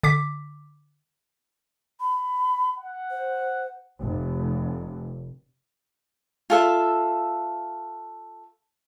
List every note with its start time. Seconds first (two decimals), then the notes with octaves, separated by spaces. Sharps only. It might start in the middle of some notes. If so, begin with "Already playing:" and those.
0.03 D3 D6 B6
2.00 B5
2.78 F#5
3.11 C5
4.01 F1
6.50 F4 A4 E5